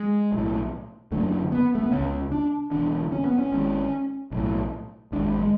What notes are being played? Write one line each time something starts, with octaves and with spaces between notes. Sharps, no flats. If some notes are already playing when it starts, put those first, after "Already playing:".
Already playing: G#3
B1 A2
F#1 F#2 D3 A3
B3
A3
B3
C#2 C#3 C#4
D4
E1 E2 D3 D4
C#4
B3
C#4
G#1 G#2
B1 A2
G#1 G#2 D4
G#3